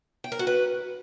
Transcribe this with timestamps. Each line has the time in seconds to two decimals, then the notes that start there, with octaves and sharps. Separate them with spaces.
0.24 G5
0.32 A#4
0.39 F#4
0.47 B4